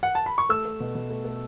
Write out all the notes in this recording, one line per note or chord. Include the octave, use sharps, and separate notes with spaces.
F#5
A5
B5
C#6
A3 E6
A3
B2
B2
A3
A3